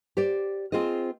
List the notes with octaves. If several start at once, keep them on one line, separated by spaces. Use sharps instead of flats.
G4 C5 D5
C4 F4 G#4 C5 D#5